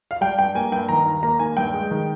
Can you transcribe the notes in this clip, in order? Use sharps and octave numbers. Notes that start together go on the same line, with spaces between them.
F5
G3 G5
G2 G5
A#3 G#5
G2 G5
D#3 A#5
D#2
A#3 A#5
D#2 G#5
G2 G5
G#3
D#3